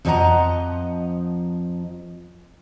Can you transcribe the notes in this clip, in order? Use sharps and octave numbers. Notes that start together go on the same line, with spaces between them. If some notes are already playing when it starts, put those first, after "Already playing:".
F2 F3 C5 D#5 F#5 A#5